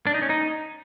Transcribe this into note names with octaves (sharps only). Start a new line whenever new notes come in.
D4
D#4
C#4
D#4